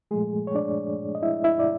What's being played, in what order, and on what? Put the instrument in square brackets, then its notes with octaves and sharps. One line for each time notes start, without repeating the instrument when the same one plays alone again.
[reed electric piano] A#2 F3 G#3 A3 G#4
C#5
D4 D5
D#5
E4 E5
E4 E5
D5